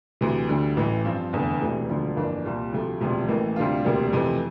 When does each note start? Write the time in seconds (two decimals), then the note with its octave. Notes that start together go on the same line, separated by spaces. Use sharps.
0.21 D2 C3 E3
0.49 D2 D3 G3
0.77 A1 A2 E3
1.04 G2 F3 C4
1.33 F1 E2 D3
1.61 E1 D2 C3 E3 A3
1.89 E1 D2 D3 F3
2.17 G1 F2 E3 A#3 D4
2.45 C2 A#2 G3
2.73 D2 C3 F3 A3
3.01 E1 D2 C3 F3
3.28 A1 A2 E3 A#3
3.56 D2 C3 G3 D4 F4
3.84 E1 D2 C3 G3 A#3
4.13 F2 C3 E3 A3